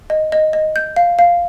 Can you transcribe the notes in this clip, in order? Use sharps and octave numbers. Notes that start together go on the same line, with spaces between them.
D#5
D#5
D#5
G6
F5
F5